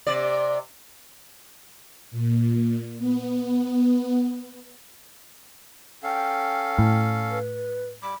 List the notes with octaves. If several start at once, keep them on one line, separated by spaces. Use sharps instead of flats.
C3 D5
A#2
B3
C#4 A4 F5 G5
A2
B4
G3 B5 D6